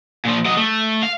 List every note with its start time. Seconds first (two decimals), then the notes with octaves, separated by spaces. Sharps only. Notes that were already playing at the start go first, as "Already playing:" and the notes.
0.25 A#2 F3
0.45 F#3 D#5
0.57 A3
1.03 F5